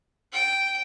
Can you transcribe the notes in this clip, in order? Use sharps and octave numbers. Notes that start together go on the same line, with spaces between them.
G5